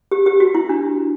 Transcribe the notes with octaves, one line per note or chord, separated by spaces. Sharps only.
G4
G4
F#4
E4
D4